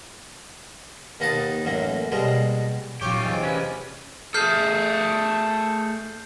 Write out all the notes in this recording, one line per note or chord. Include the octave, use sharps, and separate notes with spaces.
D#2 A#3 B3 D#4 A5
A1 F#2 F#3 A#3
B2 G3 G#3 A#3
A#2 F#3 C#4 F4 G4 C#5 G#5
E2 C3 D#5 G#5
C#4 B4
A3 G#4 A4 F6 G6 C7